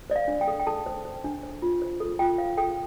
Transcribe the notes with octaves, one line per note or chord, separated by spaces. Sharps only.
C5 D5
F5
D4
G5
A4
G5
A4 A5
C5
C5
D4
C5
F4
C5
A4
F4 G5
C5 F5
A4 G5